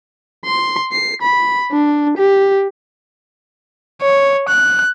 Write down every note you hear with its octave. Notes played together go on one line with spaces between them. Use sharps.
C6
C7
B5
D4
G4
C#5
F#6